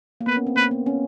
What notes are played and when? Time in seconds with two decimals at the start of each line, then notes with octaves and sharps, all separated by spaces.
0.21 A#3
0.27 B3 B4
0.37 C#4
0.47 C4
0.57 A#3 B4
0.71 B3
0.86 C#4